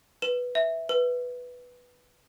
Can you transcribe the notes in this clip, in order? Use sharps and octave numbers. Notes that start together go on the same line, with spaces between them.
B4 E7
E5
B4